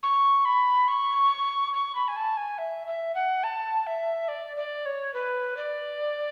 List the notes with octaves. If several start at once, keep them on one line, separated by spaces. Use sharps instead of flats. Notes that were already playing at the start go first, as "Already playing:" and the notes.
C#6
B5
C#6
C#6
B5
G#5
A5
G#5
E5
E5
F#5
A5
E5
D5
D5
C#5
B4
D5